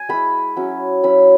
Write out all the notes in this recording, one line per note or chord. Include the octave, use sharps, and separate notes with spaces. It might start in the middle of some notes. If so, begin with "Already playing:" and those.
Already playing: G#5
G#3 E4 B5
F#3 C#4 E4
F#3 C#4 E4 B5